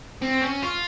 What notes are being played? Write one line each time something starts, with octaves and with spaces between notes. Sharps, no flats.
C4
C#4
F4